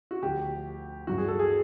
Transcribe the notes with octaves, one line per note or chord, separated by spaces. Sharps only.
F#4
D2 D3 F3 G4
G2 E3 F#4
G#4
A4
G#4